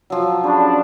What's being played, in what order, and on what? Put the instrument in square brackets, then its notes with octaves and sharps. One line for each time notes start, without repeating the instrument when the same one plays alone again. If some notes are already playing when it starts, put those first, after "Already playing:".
[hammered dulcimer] F3 F#3 [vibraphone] E6
[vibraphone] C#4 G4 G#4 [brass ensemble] D4 [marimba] A5 B5 C#6